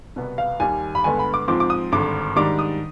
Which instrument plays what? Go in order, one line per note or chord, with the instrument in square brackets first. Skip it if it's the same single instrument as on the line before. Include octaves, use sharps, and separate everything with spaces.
[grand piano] C2 B2 B3
F5
D#2 D#3 G3 G#5
B5
G2 D3 G#3 B3 G#5
B5
D6
G#2 F3 C4 D6
D6
D#6
G#1 G2 D3 D6
G#2 D#3 G3 D4 D6
D#6